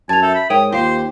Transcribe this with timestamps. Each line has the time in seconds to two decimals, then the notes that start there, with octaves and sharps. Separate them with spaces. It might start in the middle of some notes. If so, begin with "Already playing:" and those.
0.09 F#2 G#5 A5 A6 F7
0.22 A4 E5 G6
0.35 B5
0.50 G#2 A#4 C#5 G5 D#6
0.72 D#2 F4 G4 C5 F5 C7